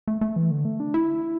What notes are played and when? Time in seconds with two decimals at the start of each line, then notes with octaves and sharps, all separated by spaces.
0.08 A3
0.21 A3
0.36 E3
0.51 D3
0.65 A3
0.80 D4
0.94 E4